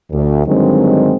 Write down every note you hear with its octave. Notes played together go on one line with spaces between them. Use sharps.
D2
G2 D3 D#3 F#3 G#3 C4